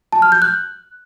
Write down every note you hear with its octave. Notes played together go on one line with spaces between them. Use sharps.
A5
F6
G6
F#6